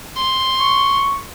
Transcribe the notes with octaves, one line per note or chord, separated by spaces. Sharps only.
C6
C#6